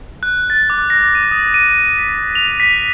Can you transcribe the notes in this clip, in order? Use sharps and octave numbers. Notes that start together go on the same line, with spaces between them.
F#6
A6
D6
A#6
D#7
D#6
D#7
B6
F7
B6